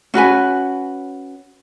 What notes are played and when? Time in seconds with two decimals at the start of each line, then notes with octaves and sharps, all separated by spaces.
0.14 C#4 F#4 B4 G#5